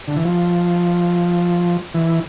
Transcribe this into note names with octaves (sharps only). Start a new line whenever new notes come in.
D3
E3
F3
E3